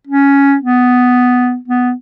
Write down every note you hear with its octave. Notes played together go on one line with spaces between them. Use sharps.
C#4
B3
B3